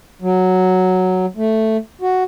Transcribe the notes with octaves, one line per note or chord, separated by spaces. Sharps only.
F#3
A3
F#4